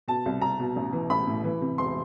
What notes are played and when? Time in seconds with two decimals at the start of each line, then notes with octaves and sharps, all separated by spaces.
0.08 B2 A5
0.26 C2
0.41 C2 A#5
0.60 B2
0.76 A1
0.93 E3
1.10 A1 B5
1.27 A2
1.44 E3
1.61 C3
1.78 E1 C6